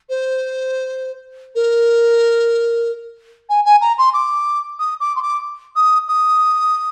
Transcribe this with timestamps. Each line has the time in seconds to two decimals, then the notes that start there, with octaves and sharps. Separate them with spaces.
0.09 C5
1.55 A#4
3.49 G#5
3.65 G#5
3.81 A#5
3.98 C6
4.13 D6
4.79 D#6
5.00 D6
5.16 C6
5.22 D6
5.76 D#6
6.08 D#6